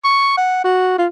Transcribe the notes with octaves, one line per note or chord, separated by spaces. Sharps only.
C#6
F#5
F#4
F4